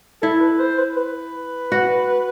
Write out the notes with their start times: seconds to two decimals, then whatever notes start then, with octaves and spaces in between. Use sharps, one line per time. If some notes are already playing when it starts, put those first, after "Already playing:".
0.22 E4 A4
0.41 B4
0.60 C5
0.78 B4
0.97 B4
1.72 F#4